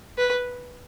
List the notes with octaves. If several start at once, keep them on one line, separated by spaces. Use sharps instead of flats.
B4